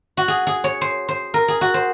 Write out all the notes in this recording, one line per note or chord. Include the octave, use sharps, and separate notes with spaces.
F#4
G#4
G#4
C#5
C5
C5
A#4
G#4
F#4
C5